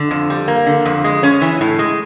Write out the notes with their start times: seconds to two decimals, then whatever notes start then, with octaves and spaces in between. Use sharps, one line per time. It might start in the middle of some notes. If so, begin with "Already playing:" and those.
Already playing: D3
0.11 F2
0.30 G3
0.48 A#3
0.66 D3
0.86 F2
1.04 G#3
1.23 C#4
1.42 E3
1.61 A2
1.79 G#3